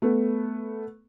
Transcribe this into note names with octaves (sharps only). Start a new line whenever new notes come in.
A3 B3